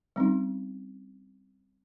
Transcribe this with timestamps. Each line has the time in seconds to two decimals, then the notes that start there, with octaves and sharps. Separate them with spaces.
0.16 G3 C4 C#4 D#4